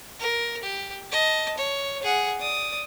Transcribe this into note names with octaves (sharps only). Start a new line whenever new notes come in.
A#4
G4
D#5 A5
C#5
G#4 F#5
D5 D#6